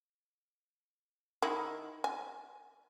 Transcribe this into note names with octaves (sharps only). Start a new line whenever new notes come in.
D#3 E4
G#5